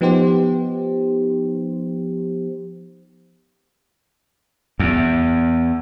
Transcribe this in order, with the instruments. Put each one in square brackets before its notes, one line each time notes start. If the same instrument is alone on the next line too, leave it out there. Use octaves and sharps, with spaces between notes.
[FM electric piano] F3 B3 D#4 G4 C5
[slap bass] E2